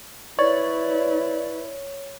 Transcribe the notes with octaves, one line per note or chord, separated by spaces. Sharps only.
E4 B4 C#5 D5